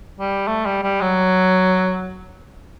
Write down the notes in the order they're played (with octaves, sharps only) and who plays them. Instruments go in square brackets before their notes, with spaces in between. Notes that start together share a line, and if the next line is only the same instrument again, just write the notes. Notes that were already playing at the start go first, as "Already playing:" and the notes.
[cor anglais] G3
A3
G3
G3
F#3